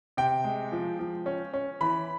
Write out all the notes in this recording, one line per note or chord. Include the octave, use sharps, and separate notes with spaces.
C3 G5
G#3
F3
F3
C#4
C#4
E3 B5